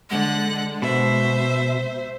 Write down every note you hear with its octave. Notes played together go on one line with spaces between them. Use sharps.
D3 G#3 F#5 F#6
B2 C5 E5